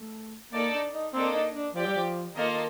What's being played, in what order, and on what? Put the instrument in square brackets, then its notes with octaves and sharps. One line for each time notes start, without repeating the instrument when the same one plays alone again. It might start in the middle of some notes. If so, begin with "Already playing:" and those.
Already playing: [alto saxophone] A3
[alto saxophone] A#3 [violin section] D#4 A4 D5
[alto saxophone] D4
D#4
[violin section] A#3 D4 A4 D#5 [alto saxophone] C4
[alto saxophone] D#4
D4
[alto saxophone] F3 [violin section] G4 D5 G5
[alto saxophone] G3
F3
[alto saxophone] D#3 [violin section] A#3 F4 A4 D#5